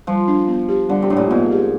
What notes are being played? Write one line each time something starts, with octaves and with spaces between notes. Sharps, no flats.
F3 G3
D4
B3
G4
D3 G3
C3
A2 D4
A#2
G#2 B3
G4